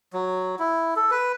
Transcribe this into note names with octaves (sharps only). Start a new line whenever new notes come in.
F#3
E4
A4
B4